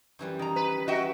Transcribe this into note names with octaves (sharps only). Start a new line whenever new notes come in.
F#2 E3 G3
D#3 A#5
B4
F#4 D#5 E5 G5